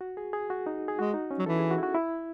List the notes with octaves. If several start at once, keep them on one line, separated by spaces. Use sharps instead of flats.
F#4
G#4
G#4
F#4
D#4
G#4
G#3 F#4
D#4
C#4
F#3
E3 A4
G#4
F#4
E4
F#4
E4